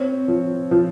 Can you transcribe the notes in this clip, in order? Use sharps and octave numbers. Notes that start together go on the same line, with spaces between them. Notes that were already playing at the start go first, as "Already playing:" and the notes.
Already playing: C4 C#5
F3
F3